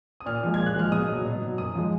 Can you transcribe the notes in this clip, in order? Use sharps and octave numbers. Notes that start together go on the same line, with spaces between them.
D#6
A#2 F6
F3 G#3
A#2 G#6
F#6
F3 G#3 F6
B2 D#6
F#3
B2
F#3
F#2 D#6
F3 G#3